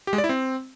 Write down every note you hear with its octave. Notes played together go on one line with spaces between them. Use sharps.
G4
G#3
D5
E4
C4